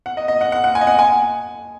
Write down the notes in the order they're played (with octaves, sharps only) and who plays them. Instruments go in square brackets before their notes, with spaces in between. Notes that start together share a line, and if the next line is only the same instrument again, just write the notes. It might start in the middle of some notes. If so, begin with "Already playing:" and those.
[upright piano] F#5
D#5
D#5
F#5
F#5
F#5
G#5
D#5
F#5
G#5